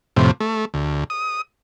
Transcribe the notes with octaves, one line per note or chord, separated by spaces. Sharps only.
F2 A2 C3
A3
D2
D#6